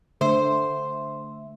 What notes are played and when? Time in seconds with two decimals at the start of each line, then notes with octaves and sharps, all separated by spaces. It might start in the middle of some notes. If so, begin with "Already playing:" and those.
0.21 D3 A3 C5 E5